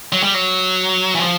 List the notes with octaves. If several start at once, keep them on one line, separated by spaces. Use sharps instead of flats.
F#3
G3
F#3
E3
F3